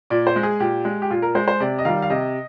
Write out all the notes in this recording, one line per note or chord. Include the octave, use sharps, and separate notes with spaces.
A#2 D5
C5
G#3
G#4
A#2 G4
G#3
G4
A#2 F4
A#4
G#3 C5
C5
C3 D5
D#5
D#3 G3 F5
F5
C3 D#5